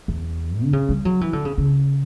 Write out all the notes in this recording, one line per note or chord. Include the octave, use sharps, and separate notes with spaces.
E2
D3
C#3
G3
F#3
E3
D3
C#3
C#3